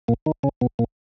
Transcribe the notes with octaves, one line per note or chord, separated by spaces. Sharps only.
A#2 A#3
D#3 D#4
C#3 C#4
B2 B3
A#2 A#3